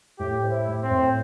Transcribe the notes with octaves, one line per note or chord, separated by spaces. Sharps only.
A2 G4
C5
E4
A2
C4
A2